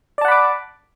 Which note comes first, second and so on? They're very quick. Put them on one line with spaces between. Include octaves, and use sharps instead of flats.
D5 A5 F#5 B5 D6